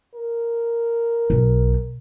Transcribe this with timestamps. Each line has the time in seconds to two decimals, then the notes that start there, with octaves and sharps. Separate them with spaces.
0.15 A#4
1.30 B1